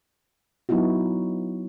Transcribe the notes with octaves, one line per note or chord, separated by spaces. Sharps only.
F#3 B3 D#4 E4 F#4